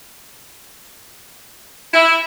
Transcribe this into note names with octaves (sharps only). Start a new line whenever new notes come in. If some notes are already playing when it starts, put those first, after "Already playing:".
E4